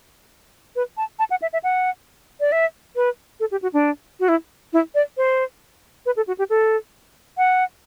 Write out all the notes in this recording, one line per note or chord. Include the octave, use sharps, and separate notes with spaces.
B4
A5
A5
F#5
E5
E5
F#5
D5
E5
B4
A4
G4
F#4
D4
F#4
E4
E4
D5
C5
B4
A4
F#4
G4
A4
F#5